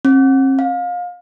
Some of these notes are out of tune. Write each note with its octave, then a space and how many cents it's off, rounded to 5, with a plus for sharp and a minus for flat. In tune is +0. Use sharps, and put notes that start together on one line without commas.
C4 +45
F5 +30